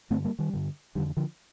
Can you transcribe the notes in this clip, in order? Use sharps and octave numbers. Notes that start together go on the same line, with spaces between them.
G2 D3 A3 C4
G3 A#3
D#3 G3
G2 D3
F2 D3 D#3 G3
D3 F3